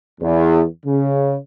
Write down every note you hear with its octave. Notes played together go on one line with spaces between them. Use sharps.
E2
C#3